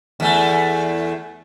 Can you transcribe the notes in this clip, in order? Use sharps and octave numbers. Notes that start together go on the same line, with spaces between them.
E2 A3